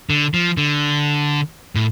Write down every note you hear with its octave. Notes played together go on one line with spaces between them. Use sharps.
D3
F3
D3
A2